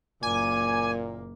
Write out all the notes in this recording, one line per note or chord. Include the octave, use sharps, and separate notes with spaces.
F#1 A#2 A#3 G#5 D6